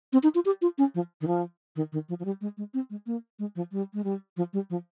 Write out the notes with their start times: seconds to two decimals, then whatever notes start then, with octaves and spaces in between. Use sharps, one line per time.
0.13 C4
0.23 D#4
0.35 F4
0.45 G4
0.62 F4
0.78 C#4
0.95 F3
1.21 D#3
1.27 F3
1.76 D#3
1.92 D#3
2.09 F3
2.19 F3
2.25 G3
2.41 G#3
2.58 G#3
2.74 C4
2.90 G#3
3.07 A#3
3.39 G#3
3.56 F3
3.72 G3
3.94 G#3
4.04 G3
4.37 F3
4.53 G3
4.70 F3